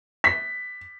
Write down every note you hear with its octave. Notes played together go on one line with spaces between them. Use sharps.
B6